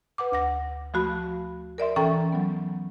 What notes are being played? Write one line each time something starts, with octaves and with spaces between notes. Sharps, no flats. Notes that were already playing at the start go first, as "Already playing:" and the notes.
B4 F#5 D6
D2 F#5 A#6
F3 A3 F#4 B5
A#4 D5 E5 C6
E3 C#4 A4 G5 A#5 C#6
F#3 B3